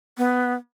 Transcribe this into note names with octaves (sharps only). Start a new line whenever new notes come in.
B3